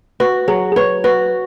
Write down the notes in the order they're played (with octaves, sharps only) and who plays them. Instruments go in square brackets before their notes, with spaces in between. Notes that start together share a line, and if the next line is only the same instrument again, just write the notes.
[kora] F#4 [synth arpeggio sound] B4
[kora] F#3 [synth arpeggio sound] G#4
[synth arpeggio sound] G#4
[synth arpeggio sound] B4 [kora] C#5
[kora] F#4 [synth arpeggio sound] B4